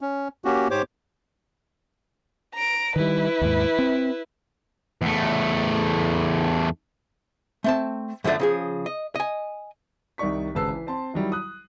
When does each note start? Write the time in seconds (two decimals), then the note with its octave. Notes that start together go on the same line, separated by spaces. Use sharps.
0.01 C#4
0.45 A#3 C#4 F#4 G4
0.71 G#2 G4 C5 C#5 D6
2.55 A#5 D7
2.96 D#3 G3 E4 B4
3.41 D#2 G#2
3.79 C4
5.02 E2 A3
7.64 A3 C4 A5
8.24 F#2 D3 F3 A3 D4
8.40 C#3 F3 G#4
8.86 D#5
9.15 D#5 G#5
10.18 C2 D#3 D5 C#6 B6
10.55 G#1 C#3 B4 A5 E6 C7
10.69 E3
10.87 C4 A5 C6
11.14 D#3 F#3 G3 E4
11.32 D#6 F#6